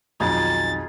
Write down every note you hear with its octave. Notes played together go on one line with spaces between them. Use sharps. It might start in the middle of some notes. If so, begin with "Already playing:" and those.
B1 F2 D#3 D#4 F4 G#4 A6